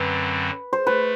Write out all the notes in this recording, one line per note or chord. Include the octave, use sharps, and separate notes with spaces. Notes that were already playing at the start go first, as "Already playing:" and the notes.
Already playing: F#2 D3 F#3 C4 B4
C5
A3 B4